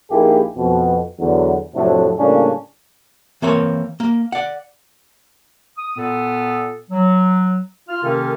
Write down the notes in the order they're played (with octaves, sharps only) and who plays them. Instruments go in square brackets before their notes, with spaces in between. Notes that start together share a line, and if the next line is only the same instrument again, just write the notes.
[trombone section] A#1 A#3 D#4 E4 G4 G#4
F2 B2
E2 D3 F#3
F2 A2 C3 F#3 A3 D4
A2 C#3 G3 A#3 C#4 D4
[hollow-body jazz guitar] E3 A#3 C4 A#4 C#5
A#3
D5 F#5
[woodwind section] D#6
A#2 B3 A4
F#3
F4 F6
C3 D#3 A#3 C#4 A4 A#4